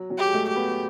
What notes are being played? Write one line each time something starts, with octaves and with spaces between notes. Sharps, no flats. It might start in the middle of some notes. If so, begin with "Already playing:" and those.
Already playing: F#3
F#3
G4
G#3
A3
G4
B3